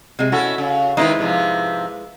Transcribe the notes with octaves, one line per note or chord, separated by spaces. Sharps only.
C3 G#3
C#4 E4 F#4 A4
C#3
D#3 G#3 C4 D#4 E4 B4
G#2 C3 F3